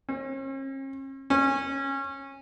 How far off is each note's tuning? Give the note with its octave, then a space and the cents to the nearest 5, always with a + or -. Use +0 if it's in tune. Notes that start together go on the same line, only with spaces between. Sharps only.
C#4 -45
C#4 -20